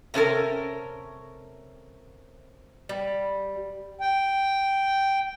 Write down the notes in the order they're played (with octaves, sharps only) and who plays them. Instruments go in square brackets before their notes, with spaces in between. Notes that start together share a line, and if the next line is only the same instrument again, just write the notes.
[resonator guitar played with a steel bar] C3 C#4 A4 A#4
[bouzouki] G3
[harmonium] G5